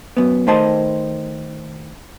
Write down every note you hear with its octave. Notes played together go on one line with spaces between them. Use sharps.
F#2 B3
D#3 A3 C5 D#5 A5